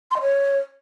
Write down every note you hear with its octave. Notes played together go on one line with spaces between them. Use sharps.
C6
D#5
C#5